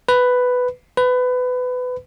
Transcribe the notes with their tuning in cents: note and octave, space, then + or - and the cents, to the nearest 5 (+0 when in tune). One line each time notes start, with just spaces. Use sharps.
B4 +10
B4 +25